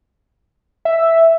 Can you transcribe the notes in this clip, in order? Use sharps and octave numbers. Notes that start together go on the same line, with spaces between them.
E5